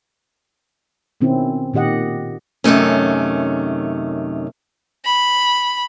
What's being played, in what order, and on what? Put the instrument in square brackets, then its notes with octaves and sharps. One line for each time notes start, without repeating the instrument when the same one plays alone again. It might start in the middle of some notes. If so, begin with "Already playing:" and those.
[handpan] B2 D#3 C4 C#4 E4
A#2 D#3 G4 D#5 F#5
[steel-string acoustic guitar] F#2 C3 D#3 A3 C#4
[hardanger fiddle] B5